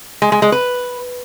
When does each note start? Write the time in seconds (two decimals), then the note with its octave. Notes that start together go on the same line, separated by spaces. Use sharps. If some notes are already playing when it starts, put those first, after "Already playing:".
0.22 G#3
0.32 G#3
0.42 G#3
0.52 B4